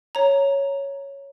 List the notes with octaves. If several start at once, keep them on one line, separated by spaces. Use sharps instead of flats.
C#5 A#5